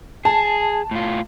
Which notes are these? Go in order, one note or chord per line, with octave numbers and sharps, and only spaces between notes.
G#4 A5
A2 F4